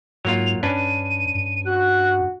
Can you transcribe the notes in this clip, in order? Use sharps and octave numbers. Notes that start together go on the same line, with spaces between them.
G#2 F#3 A#3 F4 F7
G2 C#4 D4 B4 D#7
G2
F#4 F#6